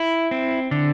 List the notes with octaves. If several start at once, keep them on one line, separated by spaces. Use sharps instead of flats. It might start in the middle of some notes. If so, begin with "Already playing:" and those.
Already playing: E4
C4
D3